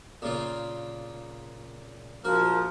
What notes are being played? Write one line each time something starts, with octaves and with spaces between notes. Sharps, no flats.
A#2 C#3 F4
A#1 F3 F#4 A#4